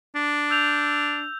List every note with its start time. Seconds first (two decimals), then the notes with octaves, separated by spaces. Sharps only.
0.15 D4
0.50 E6 G6 F7